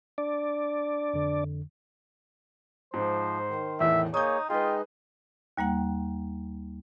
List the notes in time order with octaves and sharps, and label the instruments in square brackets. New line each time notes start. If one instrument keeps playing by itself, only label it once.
[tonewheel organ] D4 D5
[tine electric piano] F2 D3
[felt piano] G#2 [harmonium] F3 [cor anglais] C5
[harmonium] D#3
[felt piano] E2 A2 [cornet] E5
[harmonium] A#3 G#4 [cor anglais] D#4 [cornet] C#5 [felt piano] D#6 G6
[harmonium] G#3 D#4 D#5 [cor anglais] F4 [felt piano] G#4 B4 [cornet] G5
[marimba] D#2 G3 A#3 F#5